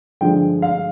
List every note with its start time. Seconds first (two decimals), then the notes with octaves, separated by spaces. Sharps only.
0.21 G2 D3 F3 G#3 G5
0.62 F5